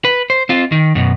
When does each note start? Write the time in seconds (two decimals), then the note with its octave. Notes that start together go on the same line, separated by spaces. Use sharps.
0.05 B4
0.30 C5
0.49 C4 F4
0.72 D#3
0.95 F#2 B2